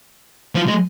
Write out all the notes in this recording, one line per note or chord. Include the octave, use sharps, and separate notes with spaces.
F3
G#3